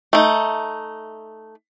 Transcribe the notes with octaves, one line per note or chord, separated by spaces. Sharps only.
A3 D#4